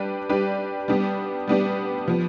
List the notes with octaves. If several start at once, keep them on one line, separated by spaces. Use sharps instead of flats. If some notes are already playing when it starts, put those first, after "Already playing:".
Already playing: G3 D4 G4 B4 D5
G3 D4 G4 B4 D5
G3 B3 D4 G4
G3 B3 D4 G4
F3 B3